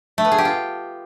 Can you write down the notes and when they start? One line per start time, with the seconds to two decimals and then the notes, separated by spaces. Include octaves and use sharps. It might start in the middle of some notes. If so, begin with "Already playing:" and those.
0.18 A3
0.25 B3
0.32 G#4
0.38 G4
0.45 F4